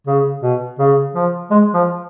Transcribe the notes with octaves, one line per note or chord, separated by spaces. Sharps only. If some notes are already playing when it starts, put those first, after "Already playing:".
C#3
B2
C#3
F3
G#3
F3